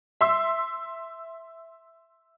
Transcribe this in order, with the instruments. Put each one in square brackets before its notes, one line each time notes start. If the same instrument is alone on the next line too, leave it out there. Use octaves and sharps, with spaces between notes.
[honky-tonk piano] E5 C6 E6